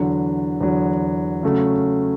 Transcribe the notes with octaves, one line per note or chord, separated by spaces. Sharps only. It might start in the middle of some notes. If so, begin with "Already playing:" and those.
Already playing: E2 D3 F#3
E2 D3 F#3
C#3 F#3 A3 C#4